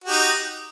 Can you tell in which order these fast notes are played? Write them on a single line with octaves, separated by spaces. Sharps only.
F#4 G4 D#4